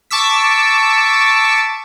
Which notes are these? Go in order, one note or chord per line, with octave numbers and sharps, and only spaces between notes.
A5 C#6 D6 E6 B6